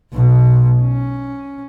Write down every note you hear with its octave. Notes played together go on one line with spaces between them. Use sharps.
B1 B2
C#4